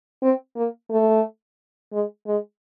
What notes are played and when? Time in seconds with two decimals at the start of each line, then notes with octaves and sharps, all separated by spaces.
0.22 C4
0.56 A#3
0.90 A3
1.92 G#3
2.26 G#3